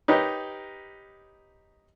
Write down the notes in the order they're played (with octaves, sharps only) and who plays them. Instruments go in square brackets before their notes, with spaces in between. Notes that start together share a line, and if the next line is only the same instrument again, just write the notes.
[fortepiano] D#4 G4 A#4 B4 C#5 D#5